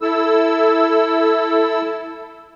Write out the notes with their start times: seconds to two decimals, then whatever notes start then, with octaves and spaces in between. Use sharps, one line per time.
0.02 E4 A4 E6